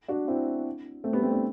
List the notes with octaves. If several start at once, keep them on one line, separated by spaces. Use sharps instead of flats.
D4 F#4
C4 E4
A3 C4
G3 B3
A3 C4
B3 D4